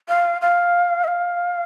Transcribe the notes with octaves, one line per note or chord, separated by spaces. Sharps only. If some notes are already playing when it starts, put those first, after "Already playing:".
F5
F5
D#5
F5